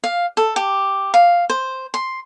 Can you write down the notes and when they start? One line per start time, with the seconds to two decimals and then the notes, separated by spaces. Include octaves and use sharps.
0.04 F5
0.37 A4
0.56 G4
1.14 F5
1.50 C5
1.94 C6